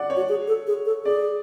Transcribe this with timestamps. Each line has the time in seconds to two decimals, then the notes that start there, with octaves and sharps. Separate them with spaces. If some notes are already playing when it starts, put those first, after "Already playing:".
Already playing: D5 F#5
0.10 C#5
0.17 F#4
0.29 G#4
0.47 A4
0.67 G#4
0.85 A4
1.04 G#4 D5